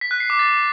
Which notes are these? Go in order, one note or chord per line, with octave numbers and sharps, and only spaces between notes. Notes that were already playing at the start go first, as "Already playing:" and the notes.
B6
F#6
C7
D6
A6